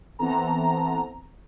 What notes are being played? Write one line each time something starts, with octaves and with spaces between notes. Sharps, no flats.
E3 B3 C4 A4 A#5